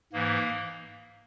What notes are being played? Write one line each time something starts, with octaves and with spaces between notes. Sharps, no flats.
G#2 E3 A#3